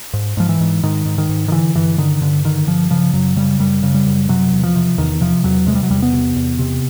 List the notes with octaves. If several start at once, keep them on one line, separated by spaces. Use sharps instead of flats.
G#2
G#2 F3
E3
G#2
G#2 D#3
G#2
D#3
G#2
D#3
D3 E3
G2 E3
D3 D#3
G2 D3
D3 D#3
G2 F3
C#3 F3
F#2 F#3
C#3 G3
F#2 G3
C#3
G3
F#2
C3 F#3
E2
F3
C3
E2 D#3
C3 F3
E2 F#3
C3 G#3
G3
F#3
E2 G3
B3
C3
E2
C3